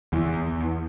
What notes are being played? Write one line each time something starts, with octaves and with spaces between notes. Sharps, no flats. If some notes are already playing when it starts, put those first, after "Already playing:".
E2